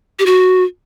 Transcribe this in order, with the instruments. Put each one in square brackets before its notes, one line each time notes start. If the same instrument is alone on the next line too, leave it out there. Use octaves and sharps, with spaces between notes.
[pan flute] G4
F#4